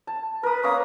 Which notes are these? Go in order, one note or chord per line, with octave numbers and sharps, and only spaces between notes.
A5
A#4 B4 D#6
A#3 C#4 D#6